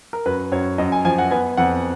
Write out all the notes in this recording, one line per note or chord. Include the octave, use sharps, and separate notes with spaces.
A#4
F#2 B4
F#2 C#5
F#2 D#5
G#5
F3 G#5
F#5
B3 G#5
F2 F#5